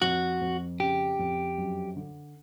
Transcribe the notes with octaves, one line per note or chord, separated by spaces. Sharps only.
F2 F#4
F2
C#3 G4
F2
F#2
D3